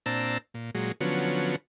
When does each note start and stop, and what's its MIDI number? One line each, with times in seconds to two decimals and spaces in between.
0.06 0.38 46
0.06 0.38 60
0.06 0.38 62
0.06 0.38 81
0.06 0.38 82
0.06 0.38 88
0.54 0.71 46
0.75 0.92 46
0.75 0.92 54
0.75 0.92 56
1.01 1.56 50
1.01 1.56 53
1.01 1.56 54
1.01 1.56 59
1.01 1.56 61